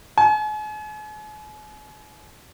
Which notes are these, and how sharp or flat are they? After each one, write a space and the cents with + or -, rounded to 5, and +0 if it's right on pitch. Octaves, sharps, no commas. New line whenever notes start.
G#5 +40